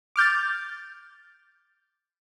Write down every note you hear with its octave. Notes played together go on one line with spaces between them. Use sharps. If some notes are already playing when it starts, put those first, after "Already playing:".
D6 F6 G6 A6